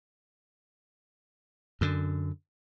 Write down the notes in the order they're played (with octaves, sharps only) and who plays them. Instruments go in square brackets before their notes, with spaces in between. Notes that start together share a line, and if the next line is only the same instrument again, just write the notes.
[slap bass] F#2 D3